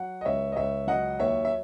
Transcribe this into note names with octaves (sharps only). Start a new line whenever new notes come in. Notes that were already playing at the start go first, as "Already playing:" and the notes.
Already playing: F#3 F#5
D#5
C#2 C#5 E5
D#5
C#2 C#5 E5
F#3 D#5 F#5
D#2 C#5 E5
E5